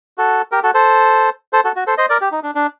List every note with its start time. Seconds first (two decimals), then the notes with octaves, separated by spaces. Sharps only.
0.18 F#4 A4
0.52 G4 A#4
0.63 F#4 A4
0.74 A4 C5
1.53 A4 C5
1.64 F#4 A4
1.76 F#4
1.87 A4 C5
1.98 C5 D#5
2.09 A#4 D5
2.21 G4
2.32 D#4
2.43 D4
2.55 D4